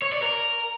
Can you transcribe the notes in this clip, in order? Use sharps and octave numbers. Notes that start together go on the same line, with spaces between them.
C#5
D5
A#4